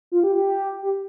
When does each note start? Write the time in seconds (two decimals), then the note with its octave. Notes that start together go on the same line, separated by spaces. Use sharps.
0.12 F4
0.24 G4
0.35 G4
0.83 G4